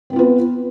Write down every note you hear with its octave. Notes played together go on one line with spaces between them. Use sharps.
B3 C4 F4 B4